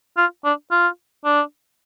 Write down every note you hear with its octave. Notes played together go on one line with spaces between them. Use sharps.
F4
D4
F4
D4